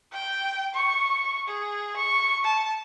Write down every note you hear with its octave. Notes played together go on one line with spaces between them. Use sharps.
G5
C#6
G#4
C#6
A5